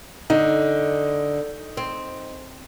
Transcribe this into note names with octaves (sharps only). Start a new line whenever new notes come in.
D3 D#4
C4